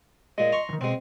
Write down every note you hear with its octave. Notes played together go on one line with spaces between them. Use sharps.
A#2 G#3 D#5
A#5 C6 C#6
E2 D#3
B2 G#3 C4